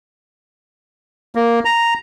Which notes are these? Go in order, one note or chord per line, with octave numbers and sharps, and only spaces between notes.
A#3
A#5